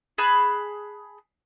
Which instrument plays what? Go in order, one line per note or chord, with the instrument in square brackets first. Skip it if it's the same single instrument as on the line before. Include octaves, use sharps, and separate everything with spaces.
[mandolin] G#4 A5 B5 F#6